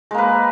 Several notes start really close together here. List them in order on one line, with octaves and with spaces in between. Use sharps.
G#3 A#3 B4